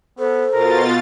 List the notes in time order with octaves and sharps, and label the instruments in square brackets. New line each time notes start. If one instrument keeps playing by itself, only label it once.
[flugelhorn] B3 [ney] A4 [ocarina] C5
[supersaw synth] B2 F4 A6 [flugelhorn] A#4